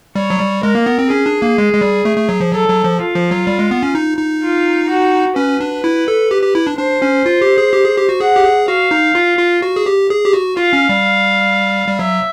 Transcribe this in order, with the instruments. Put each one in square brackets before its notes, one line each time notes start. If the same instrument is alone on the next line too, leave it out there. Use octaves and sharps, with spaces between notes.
[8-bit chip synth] G3 [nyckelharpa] C#5
[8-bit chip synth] F#3
G3
[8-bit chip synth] G#3 [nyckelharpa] A#4
[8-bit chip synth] A#3
B3
C4
[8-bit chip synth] C#4 [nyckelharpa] G#4
[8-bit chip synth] D4
A#3
G#3
G#3
G3
A3
A3
F#3
F3
[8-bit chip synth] F#3 [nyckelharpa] A4
[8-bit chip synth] F#3
F3
[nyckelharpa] F4
[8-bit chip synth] F3
F#3
G3
G#3
B3
C#4
D#4
D#4
[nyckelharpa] F4
F#4
[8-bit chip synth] C#4 [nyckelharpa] B4
[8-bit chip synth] D4
E4
A4
G4
G4
E4
D4
[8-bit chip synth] D4 [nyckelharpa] C5
[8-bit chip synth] C#4
F4
G4
G#4
G4
G#4
G4
F#4
[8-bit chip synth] G#4 [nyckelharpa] F#5
[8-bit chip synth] G4
G#4
[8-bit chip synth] F#4 [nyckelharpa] F5
[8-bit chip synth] D#4
F4
F4
F#4
G#4
G4
G#4
G4
F#4
[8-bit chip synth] F4 [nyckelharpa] F5
[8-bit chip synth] C#4
G3
G3
[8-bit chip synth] F#3 [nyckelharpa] E5